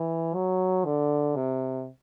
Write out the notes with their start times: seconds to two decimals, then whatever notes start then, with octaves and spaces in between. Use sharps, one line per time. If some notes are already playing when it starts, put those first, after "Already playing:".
Already playing: E3
0.34 F#3
0.85 D3
1.36 C3